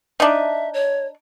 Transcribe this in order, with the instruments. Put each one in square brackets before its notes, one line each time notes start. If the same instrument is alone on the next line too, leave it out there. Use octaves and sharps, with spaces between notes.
[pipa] D4 D#4 [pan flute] E5
[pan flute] C#5